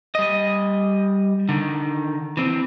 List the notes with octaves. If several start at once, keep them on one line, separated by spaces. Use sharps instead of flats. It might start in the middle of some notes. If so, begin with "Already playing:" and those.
G3 D#5
D3 D#3
E3 C4